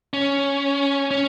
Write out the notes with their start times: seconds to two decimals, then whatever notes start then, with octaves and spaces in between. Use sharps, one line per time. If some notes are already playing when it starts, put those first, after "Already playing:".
0.13 C#4
1.11 C#4